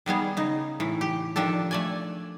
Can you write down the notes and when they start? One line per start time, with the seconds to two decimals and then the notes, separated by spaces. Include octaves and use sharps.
0.06 D#3 G3 B3 G#4
0.37 C#3 D#4
0.80 A2 E3
1.01 G4
1.36 D#3 F3 D4 G4 A4
1.71 A3 D5 G#5